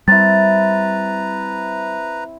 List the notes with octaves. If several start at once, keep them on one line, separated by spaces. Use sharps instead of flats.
G3 C4 E4 B4 A#5 A6